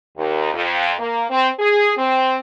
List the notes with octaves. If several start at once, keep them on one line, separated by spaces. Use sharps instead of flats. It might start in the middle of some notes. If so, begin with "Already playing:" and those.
D#2
F2
A#3
C4
G#4
C4